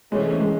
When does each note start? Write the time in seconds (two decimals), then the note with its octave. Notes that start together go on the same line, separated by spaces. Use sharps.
0.12 C3 E3 G#3 A3 C#4
0.41 G#3